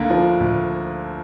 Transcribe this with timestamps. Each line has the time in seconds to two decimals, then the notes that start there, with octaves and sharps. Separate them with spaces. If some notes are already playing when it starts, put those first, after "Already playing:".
Already playing: D2 D3 A#3
0.10 F3
0.40 D2